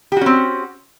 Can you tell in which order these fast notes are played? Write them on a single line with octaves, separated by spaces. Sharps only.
G4 F#4 C#4 C4